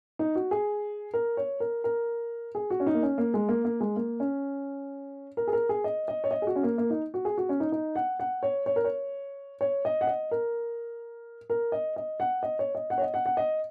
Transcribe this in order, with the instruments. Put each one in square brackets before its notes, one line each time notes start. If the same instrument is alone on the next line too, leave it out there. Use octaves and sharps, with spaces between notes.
[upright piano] D#4
F#4
G#4
A#4
C#5
A#4
A#4
G#4
F#4
C#4
D#4
A#3
C#4
A#3
G#3
A#3
A#3
G#3
A#3
C#4
A#4
G#4
A#4
G#4
D#5
D#5
C#5
D#5
G#4
F#4
C#4
A#3
A#3
D#4
F#4
G#4
F#4
C#4
D#4
D#4
F#5
F#5
C#5
C#5
A#4
C#5
C#5
D#5
F#5
D#5
A#4
A#4
D#5
D#5
F#5
D#5
C#5
D#5
F#5
C#5
D#5
F#5
F#5
D#5